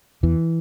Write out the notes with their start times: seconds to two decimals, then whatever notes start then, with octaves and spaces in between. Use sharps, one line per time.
0.23 E2 E3